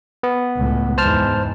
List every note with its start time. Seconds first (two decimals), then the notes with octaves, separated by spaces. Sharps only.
0.23 B3
0.56 C#2 A2
0.98 E2 G#2 C5 A5 F6